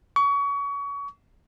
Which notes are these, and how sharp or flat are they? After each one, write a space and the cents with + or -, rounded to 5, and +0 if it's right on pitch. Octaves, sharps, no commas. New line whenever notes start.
C#6 +30